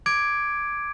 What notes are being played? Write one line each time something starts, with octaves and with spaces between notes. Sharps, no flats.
D6 G#6 D7